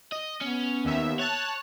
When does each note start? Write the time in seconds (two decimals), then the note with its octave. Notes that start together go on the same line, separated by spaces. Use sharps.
0.12 D#5
0.42 B3 C#4
0.85 D#2 E5
1.19 C#5 A5 F#6